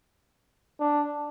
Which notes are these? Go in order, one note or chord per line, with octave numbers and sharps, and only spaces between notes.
D4